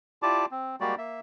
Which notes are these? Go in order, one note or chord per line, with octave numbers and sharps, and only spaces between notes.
E4 F4 G4 D5 A5 D6
C4
G3 G#3 A#3 F#4 G4 D5
A#3 E5